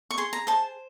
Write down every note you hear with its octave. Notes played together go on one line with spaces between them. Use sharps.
C#6
G#4 C6
A#5
C5 A5